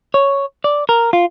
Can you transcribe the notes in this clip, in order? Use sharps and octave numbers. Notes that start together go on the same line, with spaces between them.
C#5
D5
A#4
F4